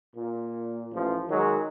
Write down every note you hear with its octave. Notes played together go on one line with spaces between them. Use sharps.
A#2
A1 F3
D#3 F#3 G#3